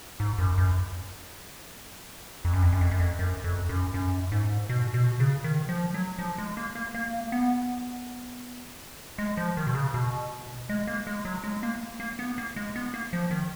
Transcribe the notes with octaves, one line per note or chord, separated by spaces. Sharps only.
G#2
F#2
F#2
F2
F#2
F2
F#2
F2
F#2
F2
F#2
F2
F#2
F#2
G#2
B2
B2
C#3
D#3
F3
F#3
F3
G#3
A#3
A#3
A#3
B3
G#3
F3
D#3
B2
C#3
B2
G#3
A#3
G#3
F#3
G#3
A#3
A#3
B3
A#3
G#3
B3
A#3
F3
D#3